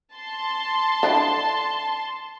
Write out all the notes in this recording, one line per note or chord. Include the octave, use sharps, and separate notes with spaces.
A5 C6
D3 D4 E4